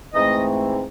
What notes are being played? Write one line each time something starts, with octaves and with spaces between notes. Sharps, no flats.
G#2 E3 A3 C4 D#5